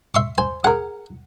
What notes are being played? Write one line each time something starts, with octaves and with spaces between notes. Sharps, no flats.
E5 C6 C#6
C5 G#5
G#4 A#4 F#5